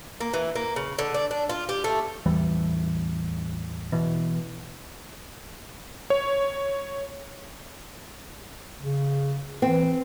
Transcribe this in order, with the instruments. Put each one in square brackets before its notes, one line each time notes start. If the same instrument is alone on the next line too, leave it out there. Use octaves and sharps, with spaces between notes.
[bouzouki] A#3
E3
A#3
C#3
D3
D4
D4
F4
G4
A3
[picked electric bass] A1 E2 E3 G3
B2 E3
[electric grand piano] C#5
[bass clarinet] C#3
[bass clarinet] E3 [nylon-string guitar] C4